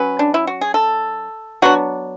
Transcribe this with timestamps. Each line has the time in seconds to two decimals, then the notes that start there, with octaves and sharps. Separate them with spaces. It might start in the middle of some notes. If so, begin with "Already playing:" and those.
Already playing: F#3 C#4 B4
0.19 D4
0.34 E4
0.47 F#4
0.61 G#4
0.74 A4
1.62 F#3 B3 D4 F#4